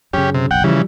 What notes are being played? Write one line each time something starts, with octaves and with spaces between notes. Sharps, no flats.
F#2 C#3 C#4 G4
C3
F#1 B1 F#5 G5
C#3 E3 F3 G3